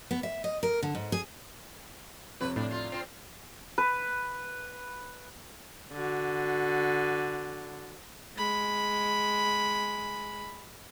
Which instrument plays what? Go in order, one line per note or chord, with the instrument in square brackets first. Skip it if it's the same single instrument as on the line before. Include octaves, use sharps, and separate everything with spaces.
[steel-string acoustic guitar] B3
E5
D#5
A#4
D3
G#2
G#4
[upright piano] F2 C3 C#5 [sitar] B4
[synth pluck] A2 [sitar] D4
[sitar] F4
C4 F4
[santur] B4
[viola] D3 F#4
[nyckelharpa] G#3 B5